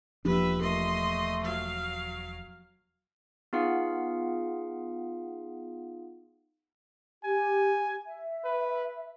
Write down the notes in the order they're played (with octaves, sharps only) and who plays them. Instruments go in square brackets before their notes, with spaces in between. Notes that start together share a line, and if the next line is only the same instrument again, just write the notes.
[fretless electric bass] E1 D4 [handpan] F3 A#3 G4 [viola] B4 E5
[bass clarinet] A3 [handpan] A#4 [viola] D#5 C6
[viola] F#3 F5
[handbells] B3 D#4 F4 G#4 F5 F#5
[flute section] G4 [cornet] G#5
[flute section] E5
[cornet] B4